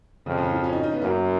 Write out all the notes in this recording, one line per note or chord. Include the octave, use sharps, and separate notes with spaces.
F2 C#3
C#3
F3
C#4
D#4
D#4
B3
F#2 A#3